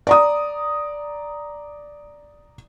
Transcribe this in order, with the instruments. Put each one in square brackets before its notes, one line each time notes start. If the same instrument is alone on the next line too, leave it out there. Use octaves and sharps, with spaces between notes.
[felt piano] D5 A#5 D#6